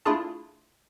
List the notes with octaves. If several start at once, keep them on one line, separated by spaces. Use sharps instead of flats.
A3 D4 E4 F4 G#4 A5